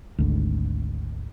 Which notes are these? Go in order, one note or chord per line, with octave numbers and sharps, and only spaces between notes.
G#1 D2